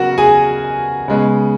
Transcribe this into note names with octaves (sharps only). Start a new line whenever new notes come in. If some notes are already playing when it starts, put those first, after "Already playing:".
Already playing: C#3 F#3 B3 F#4 A#4 F#5
G#4 G#5
C#3 G#3 B3